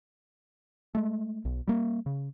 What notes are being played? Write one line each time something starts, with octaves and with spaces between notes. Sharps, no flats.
G#3 A3
B1
G3 A#3
C#3